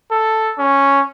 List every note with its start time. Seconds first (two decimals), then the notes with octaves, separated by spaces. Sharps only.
0.11 A4
0.58 C#4